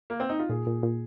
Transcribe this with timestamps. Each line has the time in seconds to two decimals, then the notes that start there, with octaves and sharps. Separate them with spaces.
0.10 A#3
0.20 C4
0.29 D#4
0.39 F4
0.49 A#2 G#4
0.67 A#2
0.83 A#2